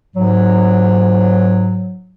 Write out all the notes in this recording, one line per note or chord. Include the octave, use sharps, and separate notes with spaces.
G#2 F#3